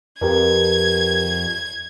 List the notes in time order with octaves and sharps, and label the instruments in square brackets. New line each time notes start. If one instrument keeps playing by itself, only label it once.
[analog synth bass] F2 [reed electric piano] G4 A#4 B4 [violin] G#6